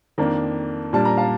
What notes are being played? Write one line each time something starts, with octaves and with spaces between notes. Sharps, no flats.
F2 D#3 A#3 D4
A#2 G3 D4 A5
A#5
F5 A5